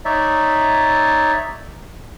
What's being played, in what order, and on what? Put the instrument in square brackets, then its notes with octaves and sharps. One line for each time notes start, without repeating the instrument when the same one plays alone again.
[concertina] D#4 C#5 D5 E5